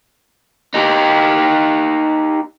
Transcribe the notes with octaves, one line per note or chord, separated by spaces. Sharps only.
D#4 G4